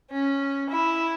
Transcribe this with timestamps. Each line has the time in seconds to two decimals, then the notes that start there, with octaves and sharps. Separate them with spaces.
0.11 C#4
0.70 E4